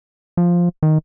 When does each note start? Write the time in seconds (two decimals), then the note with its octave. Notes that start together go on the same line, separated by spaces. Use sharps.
0.37 F3
0.83 D#3